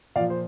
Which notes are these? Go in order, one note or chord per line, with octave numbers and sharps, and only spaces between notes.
A#2 F3 D5 F5
C5